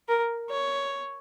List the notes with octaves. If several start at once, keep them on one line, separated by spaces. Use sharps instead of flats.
A#4
C#5